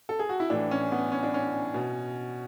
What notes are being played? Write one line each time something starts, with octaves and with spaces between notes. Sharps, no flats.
A4
G#4
F#4
E4
A2 E3 D4
C#4
B3
C#4
D4
C#4
B2